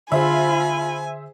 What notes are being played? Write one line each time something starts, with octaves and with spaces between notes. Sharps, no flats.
D3 F4 G#4 C5 E5 G#5 B5